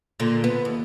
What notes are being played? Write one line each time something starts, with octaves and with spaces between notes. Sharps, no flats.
A#2 D3
B3
D#2